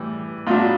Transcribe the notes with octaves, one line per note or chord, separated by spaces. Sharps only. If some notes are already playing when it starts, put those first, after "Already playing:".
Already playing: A2 E3 G3
A2 F#3 B3 D4 F4